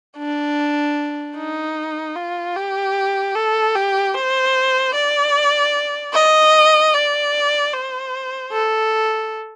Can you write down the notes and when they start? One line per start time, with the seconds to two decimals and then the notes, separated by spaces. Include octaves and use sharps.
0.17 D4
1.36 D#4
2.16 F4
2.56 G4
3.35 A4
3.75 G4
4.14 C5
4.95 D5
6.14 D#5
6.93 D5
7.73 C5
8.52 A4